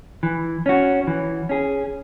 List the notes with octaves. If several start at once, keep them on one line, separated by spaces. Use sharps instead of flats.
E3
C#4 F#4
E3
C#4 G#4